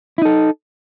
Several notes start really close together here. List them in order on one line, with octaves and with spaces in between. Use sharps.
E4 D#4 A4